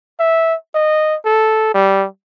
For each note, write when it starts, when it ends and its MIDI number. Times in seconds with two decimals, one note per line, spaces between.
0.20 0.55 76
0.75 1.16 75
1.25 1.71 69
1.74 2.06 55